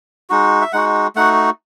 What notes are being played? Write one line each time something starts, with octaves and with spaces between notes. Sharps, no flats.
G#3 D#4 F#4
E5
G#3 D#4 F#4 F#5
A3 D#4 F#4 F#5